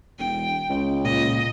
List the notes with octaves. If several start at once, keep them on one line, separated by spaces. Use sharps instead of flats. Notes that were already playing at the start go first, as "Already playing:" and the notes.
E1 G5
C#2
A#2 D#5